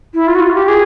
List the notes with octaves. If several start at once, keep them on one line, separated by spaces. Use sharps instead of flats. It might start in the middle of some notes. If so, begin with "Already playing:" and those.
E4
F4
F#4
F4
G4
G#4